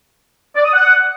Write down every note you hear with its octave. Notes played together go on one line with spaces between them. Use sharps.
D5
D#6
F#5